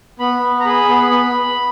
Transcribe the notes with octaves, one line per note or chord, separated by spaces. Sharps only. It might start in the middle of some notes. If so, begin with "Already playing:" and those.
B3 B5
B3
A#5
G#4 B5
B3
B3